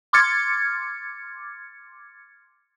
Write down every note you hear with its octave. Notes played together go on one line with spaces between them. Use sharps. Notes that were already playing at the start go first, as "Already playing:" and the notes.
C6 D6 F6 G#6 A6 C#7